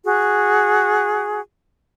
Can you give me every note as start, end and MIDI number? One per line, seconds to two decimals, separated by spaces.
0.05 1.39 66
0.05 1.39 68